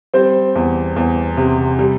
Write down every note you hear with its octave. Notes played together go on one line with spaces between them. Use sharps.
G3 C4 C5
E2
E2
C3
G3